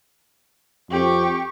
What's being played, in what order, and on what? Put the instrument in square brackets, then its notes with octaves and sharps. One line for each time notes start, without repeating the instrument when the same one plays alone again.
[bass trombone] F2 [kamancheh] G4 C#6